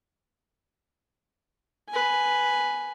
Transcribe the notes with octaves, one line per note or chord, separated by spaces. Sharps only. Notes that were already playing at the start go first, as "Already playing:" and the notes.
B4 G#5